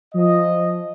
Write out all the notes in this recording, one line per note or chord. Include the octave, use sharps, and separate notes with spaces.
F3 D#5